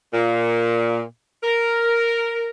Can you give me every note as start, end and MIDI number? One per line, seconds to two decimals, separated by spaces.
0.14 1.01 46
1.44 2.49 70